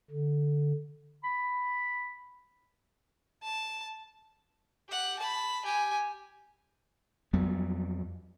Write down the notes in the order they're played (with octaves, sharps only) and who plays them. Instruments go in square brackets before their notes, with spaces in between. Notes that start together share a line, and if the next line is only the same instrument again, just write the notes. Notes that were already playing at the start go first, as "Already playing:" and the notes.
[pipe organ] D3
[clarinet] B5
[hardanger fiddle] A5
G4 F#5
A5 B5
G4 G#5
[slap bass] F2 F#3 G3 B3